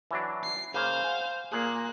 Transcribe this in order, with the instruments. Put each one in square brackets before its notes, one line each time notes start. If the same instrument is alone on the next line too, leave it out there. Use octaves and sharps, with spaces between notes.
[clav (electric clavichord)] E3 F#3 D4
[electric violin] C7
[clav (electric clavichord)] C#3 A#3 [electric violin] C5 F5
[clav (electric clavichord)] F#5 G#5
[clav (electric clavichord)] A#2 G#4 [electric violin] A#3 F#6